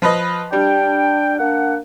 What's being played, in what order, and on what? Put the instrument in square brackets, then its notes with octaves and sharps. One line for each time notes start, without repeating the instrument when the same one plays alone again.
[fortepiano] F3 B4 D#5
[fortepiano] G3 [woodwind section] D4 G5
[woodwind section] A#3 D4 F#5